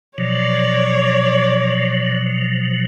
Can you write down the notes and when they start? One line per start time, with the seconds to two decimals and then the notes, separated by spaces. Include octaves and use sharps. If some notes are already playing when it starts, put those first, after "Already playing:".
0.18 B2 F3 F#3 C#5 D5